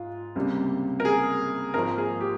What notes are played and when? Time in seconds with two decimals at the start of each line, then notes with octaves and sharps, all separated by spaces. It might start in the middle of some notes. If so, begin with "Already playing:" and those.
Already playing: G#2 F4
0.35 C#2 C3 G3 A#3
1.00 A#4
1.05 G#4
1.74 G#1 G#2 F3 A#3 A#4
1.98 G#4
2.21 G4